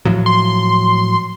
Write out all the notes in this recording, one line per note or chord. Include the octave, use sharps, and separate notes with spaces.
A2 F3 F#3
C6